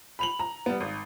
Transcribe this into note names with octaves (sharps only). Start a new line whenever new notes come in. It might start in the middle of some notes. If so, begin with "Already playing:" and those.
B5 F7 F#7
A#5
G3 B3
G#1